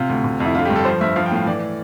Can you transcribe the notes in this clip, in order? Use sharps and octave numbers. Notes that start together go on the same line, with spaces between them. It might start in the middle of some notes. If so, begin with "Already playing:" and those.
Already playing: C3 F4
D2
C3
F2
E4
D3 F4
G4
G2
A4
F3 C5
G2 E5
F3 F5
G5
A2 F5
E3 D5